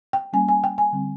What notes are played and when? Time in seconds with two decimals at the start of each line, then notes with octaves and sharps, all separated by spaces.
0.13 G5
0.33 G3 A#3 C#4 G#5
0.49 G#5
0.64 G5
0.78 G#5
0.92 D3 G3 C4